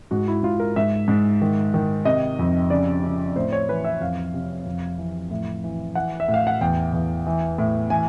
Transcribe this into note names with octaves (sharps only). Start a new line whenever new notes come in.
G#2 F#4
E4
G#2 F4
A#4
G#2 E5
G#2
D#3
D#3
C3 D#5
F2
C#3 D5
C#3
A2 C5
C#5
E3 B4
E5
F2 F5
C3
F2
E3
A2
E3
E3 F#5
E5
A2
F5
F#5
E2 G5
E2
E3
A2
E3 G#5